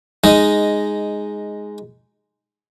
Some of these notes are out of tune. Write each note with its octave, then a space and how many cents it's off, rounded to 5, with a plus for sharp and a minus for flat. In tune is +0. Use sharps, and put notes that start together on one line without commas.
G#3 +0 D#4 -5 D#5 +0